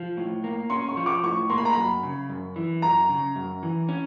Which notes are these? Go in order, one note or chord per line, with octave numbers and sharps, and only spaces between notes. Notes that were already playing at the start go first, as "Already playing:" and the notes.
Already playing: F3
A2
A#3
C#4 C6
C#6
F3
D6
A2 C#6
A#3 C6
B5
A#5
F#2 B5
C#3
F#2
E3
F#2 A#5
C#3
F#2
E3
C#4